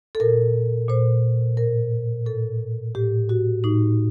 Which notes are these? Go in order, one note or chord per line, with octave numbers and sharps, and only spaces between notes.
A4
A#2 A#4
A#2 C5
A2 A#4
A2 A4
A2 G4
F#4
A2 D#4